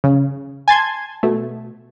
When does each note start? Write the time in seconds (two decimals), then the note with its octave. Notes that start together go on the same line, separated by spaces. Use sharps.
0.04 C#3
0.68 G#5 A5 C6 G#6
1.23 B2 A3